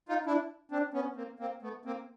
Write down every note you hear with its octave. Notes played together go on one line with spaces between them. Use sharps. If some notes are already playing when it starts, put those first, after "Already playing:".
D#4 F4
D4 E4
C4 D4
B3 C#4
A#3 C4
A#3 C4
A3 B3
A#3 C4